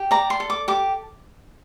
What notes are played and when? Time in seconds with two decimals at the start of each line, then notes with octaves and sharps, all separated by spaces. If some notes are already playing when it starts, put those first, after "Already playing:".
Already playing: G4
0.11 D5 A#5
0.30 C6
0.40 A4
0.50 D6
0.68 G4 D6